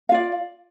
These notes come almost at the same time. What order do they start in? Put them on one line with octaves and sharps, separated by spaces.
F5 F4 D5